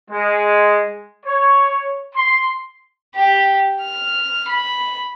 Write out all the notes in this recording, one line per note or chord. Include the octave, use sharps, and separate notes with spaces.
G#3
C#5
C6
G4
F6
B5